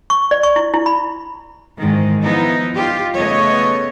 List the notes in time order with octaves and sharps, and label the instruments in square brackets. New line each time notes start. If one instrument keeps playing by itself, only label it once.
[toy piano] C#6
D5
C#6
E4
E4
B5
[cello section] G#2 D#3 E3
F3 B3 D#4 E4
D#4 F4 G4
C#3 A3 B3 C#5 D#5